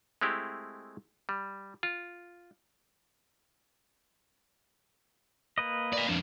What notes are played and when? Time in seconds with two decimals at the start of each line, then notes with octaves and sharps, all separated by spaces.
0.21 G#3 A3 C4 E4 G4
1.29 G3
1.83 F4
5.58 A#3 B4 D#5
5.93 D5 F5
6.09 F2 D4